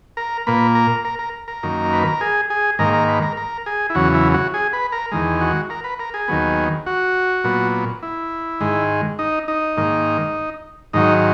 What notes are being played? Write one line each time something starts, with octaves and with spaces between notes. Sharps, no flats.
A#4
A#2 A#3 B4
A#4
A#4
A#4
A#4
F#2 D#3 A#3
B4
A#4
G#4
G#4
G#2 D#3 A#3 A#4
A#4
B4
A#4
A#4
G#4
E4
E2 C#3 F#3 F#4
E4
F#4
G#4
B4
A#4
E2 D#3 G#3
F#4
A#4
B4
A#4
G#4
D#2 D#3 F#3 B3
F#4
A#2 F#3 B3
E4
G#2 D#3 G#3
D#4
D#4
G#2 D#3 A#3
G#2 D#3 F#3 D#4